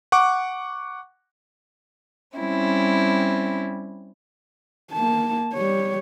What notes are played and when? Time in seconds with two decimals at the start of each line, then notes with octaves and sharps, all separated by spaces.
0.12 F#5 C#6 D6
2.37 G3 C4 C#4 E4
4.93 A#3 A5
5.54 G3 C#5